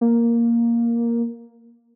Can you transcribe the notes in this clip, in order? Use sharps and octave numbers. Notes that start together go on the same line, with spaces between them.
A#3